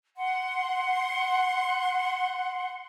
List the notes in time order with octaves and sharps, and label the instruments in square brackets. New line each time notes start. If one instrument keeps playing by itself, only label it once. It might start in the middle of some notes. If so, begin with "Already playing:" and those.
[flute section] F#5 C6